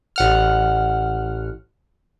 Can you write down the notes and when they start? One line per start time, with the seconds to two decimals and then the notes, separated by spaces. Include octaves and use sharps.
0.16 A1 F#5 F6